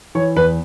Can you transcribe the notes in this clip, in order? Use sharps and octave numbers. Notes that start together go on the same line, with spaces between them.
E3 C#5
E2 B4